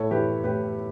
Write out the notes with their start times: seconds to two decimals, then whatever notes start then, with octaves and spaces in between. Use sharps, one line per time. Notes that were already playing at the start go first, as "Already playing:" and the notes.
Already playing: A2 A4 C#5
0.11 E3 G4 B4
0.44 A2 G4 B4